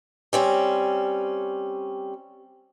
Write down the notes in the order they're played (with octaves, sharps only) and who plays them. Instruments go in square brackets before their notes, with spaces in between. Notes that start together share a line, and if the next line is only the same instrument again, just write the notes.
[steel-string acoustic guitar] G3 C4 C#4